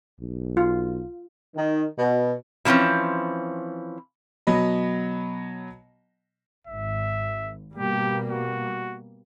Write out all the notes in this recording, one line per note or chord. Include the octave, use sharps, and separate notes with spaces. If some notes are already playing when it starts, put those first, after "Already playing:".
B1
F4
D#3
B2
B2 E3 F3 C4 C#4
B2 F#3 D#5 B5
G#1 E5
B2 G3 A#3 G4
F#4